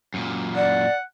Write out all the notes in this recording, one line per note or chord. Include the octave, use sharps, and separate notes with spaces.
F#2 A#2
D5 F#5